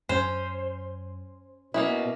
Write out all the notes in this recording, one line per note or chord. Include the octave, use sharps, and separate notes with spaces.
F#2 C#4 C5
B2 A#3 C#4 E4 D#6